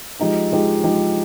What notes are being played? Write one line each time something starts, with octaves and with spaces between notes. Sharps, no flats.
F3 G#3 D#4 G4
F3 G#3 D#4 G4
F3 G#3 D#4 G4